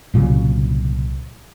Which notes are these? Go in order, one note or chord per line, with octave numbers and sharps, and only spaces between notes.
C2 A#2 C#3 F#3